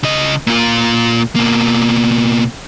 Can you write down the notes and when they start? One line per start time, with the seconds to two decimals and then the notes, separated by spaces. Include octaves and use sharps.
0.03 C#3 D#5
0.47 A#2 F4
1.35 B2 A#3